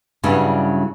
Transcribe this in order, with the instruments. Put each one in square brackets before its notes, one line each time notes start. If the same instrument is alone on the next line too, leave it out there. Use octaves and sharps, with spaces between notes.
[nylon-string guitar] G2 C#3 F#3 G3 D4 E4